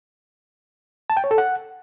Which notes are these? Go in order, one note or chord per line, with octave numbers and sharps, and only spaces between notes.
A5
G5
C#5
A4
F#5